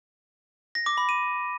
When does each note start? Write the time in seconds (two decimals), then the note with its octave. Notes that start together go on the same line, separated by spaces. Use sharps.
0.75 A#6
0.86 D6
0.98 B5
1.09 D#7